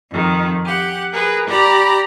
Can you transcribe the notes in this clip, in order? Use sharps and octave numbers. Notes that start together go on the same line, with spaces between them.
F2 D#3
G4 F#5
G#4 A#4 B4
G4 D5 A#5 B5